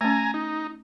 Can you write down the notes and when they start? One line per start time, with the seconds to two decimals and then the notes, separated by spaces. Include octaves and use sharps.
0.01 A3 C#4 G#5 A#5
0.34 D#4